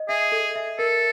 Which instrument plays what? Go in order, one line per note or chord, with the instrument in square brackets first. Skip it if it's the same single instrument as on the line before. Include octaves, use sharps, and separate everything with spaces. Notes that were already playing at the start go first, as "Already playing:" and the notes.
Already playing: [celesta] D#5
[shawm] G#4 [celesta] E5
[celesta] A4
E5
[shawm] A4 [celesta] A#4